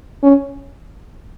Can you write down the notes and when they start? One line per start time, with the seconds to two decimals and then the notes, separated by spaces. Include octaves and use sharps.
0.23 C#4